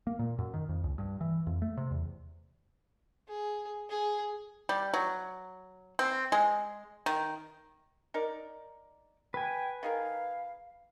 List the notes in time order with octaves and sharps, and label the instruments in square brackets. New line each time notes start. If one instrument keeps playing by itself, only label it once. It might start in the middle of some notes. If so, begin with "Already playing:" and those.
[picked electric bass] A#3
A#2
F#2
D#3
F2
C#2
G2
E3
F2
A3
C3
E2
[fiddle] G#4
G#4
[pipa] G3
F#3
C4
G#3
D#3
D#4 A#4 D5
[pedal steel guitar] B4 G#5 [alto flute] G5
[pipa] D#3 G#4 A#4 [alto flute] F5